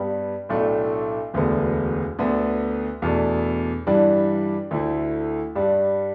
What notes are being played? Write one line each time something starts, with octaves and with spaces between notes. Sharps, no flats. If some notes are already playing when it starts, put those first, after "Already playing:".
Already playing: G2 G3 B3
B1 A2 A3 D4
E1 D2 D3 B3
D2 D3 B3
E2 B2 A3 D4
G2 E3 G3 D4
D2 D3 A3 E4
G2 G3 D4